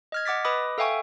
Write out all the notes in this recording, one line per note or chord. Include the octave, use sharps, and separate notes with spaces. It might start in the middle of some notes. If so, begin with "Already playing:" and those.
D#5 F6 G#6
D#5 F#5 D6 A6 B6
B4 D#5 B5 D6 D#6
A4 E5 F5 G5 G#5 C#6